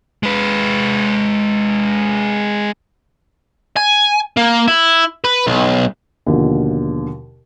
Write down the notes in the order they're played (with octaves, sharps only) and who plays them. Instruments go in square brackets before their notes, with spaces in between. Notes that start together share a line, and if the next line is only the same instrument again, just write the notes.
[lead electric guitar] G#3 B4
[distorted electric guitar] G#5
A#3
E4
B4
B1
[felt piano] D#2 B2 D3 F3